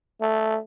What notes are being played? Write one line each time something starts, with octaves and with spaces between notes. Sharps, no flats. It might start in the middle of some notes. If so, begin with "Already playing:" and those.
A3